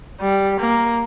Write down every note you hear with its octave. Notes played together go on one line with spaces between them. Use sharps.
G3
A#3